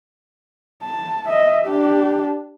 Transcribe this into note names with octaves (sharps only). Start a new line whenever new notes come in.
A5
D#5 E5
D4 G4